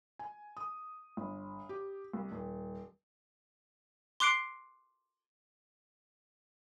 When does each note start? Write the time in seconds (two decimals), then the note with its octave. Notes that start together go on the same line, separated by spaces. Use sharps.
0.19 G#5
0.57 D#6
1.17 G1
1.69 G4
2.13 C2
2.32 D#1
4.20 C6 D6 F#6 C7 D7